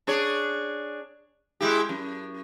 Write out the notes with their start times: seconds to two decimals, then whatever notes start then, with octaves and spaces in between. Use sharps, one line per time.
0.07 D4 G#4 C#5
1.61 G#3 E4 G4
1.89 F#2